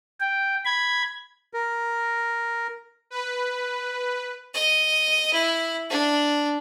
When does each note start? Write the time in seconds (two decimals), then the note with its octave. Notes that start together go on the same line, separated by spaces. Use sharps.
0.20 G5
0.65 B5 G#6
1.54 A#4
3.10 B4
4.54 D#5
5.33 E4
5.90 D4